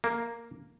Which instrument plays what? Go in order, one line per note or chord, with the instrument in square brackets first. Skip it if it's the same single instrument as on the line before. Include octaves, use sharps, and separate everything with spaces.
[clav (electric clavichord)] A#3